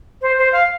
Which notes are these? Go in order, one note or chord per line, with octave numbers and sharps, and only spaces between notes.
C5
C5
F5